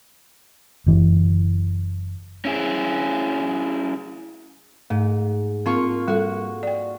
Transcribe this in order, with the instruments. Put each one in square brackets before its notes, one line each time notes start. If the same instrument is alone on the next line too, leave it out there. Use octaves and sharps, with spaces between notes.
[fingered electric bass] F#1 E3
[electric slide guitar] C#4 E4 G#4
[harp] G#2 [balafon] A3
[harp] A#3 F4 C#6 [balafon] C4
[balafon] G3 A4 [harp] F#4
[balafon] D5 G5